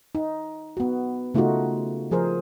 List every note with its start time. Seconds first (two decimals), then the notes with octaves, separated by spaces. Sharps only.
0.15 D#4
0.77 B3 F#4
1.34 C#3 A3 D#4 F4 F#4
2.11 F3 G#4 A#4 C5